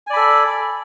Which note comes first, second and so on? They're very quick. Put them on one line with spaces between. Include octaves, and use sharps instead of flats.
G#5 D5 B5 A4